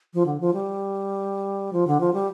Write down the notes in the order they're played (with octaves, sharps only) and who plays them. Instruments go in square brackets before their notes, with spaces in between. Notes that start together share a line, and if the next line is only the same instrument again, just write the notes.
[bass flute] F3
D3
F3
G3
F3
D3
F3
G3